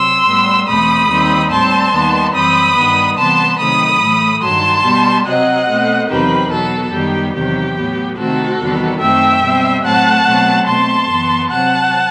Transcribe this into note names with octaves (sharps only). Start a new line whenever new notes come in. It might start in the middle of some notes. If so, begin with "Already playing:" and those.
Already playing: C3 F#3 C6 E6
A2 G3 B3
E2 B2 A3 C4 B5 D#6
D#2 D#3 G3 C4
A2 G3 C4 A5 C6
D#2 D#3 G3 B3
F#2 E3 G3 C4 B5 D#6
G2 D#3 G3 B3
C3 E3 G3 B3 A5 C6
C3 D#3 F#3 A3 B5 D#6
A2 E3 A3
G2 D#3 F#3 A5 C6
B2 G3 B3
C3 F#3 C4 D#5 F#5
B2 A3 C4
E2 C3 D#3 F#3 C4 G4 B4
B2 F#3 B3 F#4 A4
F#2 D#3 G3 B3 G4
E2 C3 D#3 F#3 G4
A2 F#3 B3
C3 D#3 A3 C4 F#4 A4
E2 C3 D#3 G3 B3
F#2 D#3 A3 C4 E5 G5
B2 G3 C4
A2 F#3 A3 C4 F#5 A5
B2 F#3 A3 C4
B2 A3 C4 A5 C6
F#2 E3 B3
C3 F#3 C4 F#5 A5